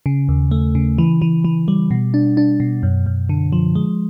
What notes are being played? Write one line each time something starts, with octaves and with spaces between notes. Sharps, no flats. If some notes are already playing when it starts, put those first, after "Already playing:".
C#3
D#2
A3
C#3
E3
E3
E3
G3
B2
D4
D4
B2
F#2
F#2
D3
F3
G#3